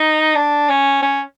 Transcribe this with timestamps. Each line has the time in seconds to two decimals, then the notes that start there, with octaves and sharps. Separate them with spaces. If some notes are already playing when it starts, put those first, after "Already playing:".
Already playing: D#4
0.35 D4
0.69 C#4
1.02 C#4